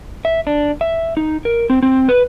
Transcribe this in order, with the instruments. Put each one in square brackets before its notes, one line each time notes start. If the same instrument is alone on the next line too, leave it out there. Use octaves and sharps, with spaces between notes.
[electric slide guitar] E5
D4
E5
D#4
A#4
C4
C4
B4